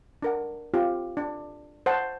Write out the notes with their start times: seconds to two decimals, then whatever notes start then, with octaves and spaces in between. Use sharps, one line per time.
0.22 D4 A#4 F#5
0.74 C4 F4 G4
1.17 D4
1.86 C5 F#5 A5